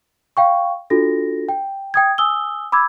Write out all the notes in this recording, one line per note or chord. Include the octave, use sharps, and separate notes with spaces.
F5 G5 C#6
D4 F4 F#4 A4 A#6
G5
G5 D#6 G#6
G#5 D#6 E6 G7
B5 D6 E6 G#6